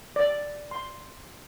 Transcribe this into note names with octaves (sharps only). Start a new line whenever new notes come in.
D5
C6